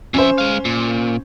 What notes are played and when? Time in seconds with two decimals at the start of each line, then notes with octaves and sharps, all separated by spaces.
0.14 F2 C#4 C5 E5
0.38 G#3 F5
0.65 A#2